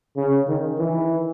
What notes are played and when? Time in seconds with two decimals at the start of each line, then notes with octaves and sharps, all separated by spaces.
0.17 C#3
0.48 D#3
0.79 E3